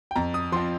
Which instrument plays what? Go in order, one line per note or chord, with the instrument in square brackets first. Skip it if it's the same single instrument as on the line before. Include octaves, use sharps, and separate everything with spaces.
[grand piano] G5
F2 A#5
D#6
F3 C6
C4